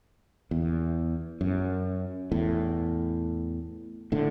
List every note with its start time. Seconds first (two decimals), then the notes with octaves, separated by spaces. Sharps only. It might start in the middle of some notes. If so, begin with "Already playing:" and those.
0.51 E2
1.41 F#2
2.32 E2 A2
4.12 A2 D3